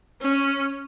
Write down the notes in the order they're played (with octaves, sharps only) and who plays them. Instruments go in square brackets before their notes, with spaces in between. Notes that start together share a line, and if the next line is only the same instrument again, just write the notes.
[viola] C#4